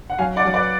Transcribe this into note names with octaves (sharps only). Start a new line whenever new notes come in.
F#5
F#3 F5 G#5
D5 F#5
F#3
B4 D5